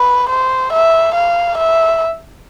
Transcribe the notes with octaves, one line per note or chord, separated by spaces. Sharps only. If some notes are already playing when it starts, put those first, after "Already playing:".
Already playing: B4
C5
E5
F5
E5